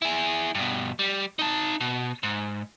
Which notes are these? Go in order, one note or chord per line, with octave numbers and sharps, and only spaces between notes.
E4 G#4
G2 B2
G3
D#4 A5
B2
G#2